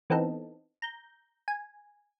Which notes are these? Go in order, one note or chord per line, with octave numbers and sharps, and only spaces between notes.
E3 B3 C4 D#4 A4
A#5 G6
G#5